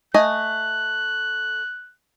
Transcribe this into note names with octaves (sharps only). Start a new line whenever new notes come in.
A3 D#5 G#5 F#6